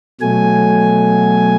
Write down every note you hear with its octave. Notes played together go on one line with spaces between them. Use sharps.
B2 F#3 A3 G#5